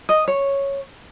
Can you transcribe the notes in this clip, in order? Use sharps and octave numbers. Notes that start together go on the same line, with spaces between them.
D#5
C#5